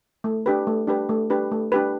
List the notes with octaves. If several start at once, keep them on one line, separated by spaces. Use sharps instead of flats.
A3
D4 G4 B4
A3
D4 G4 B4
A3
D4 G4 B4
A3
D4 G4 B4